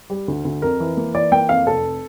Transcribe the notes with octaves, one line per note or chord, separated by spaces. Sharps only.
G3
D2
D2
F2 A#4
E3
A#3
E3 D5
A#3 G5
F2 F5
F1 A4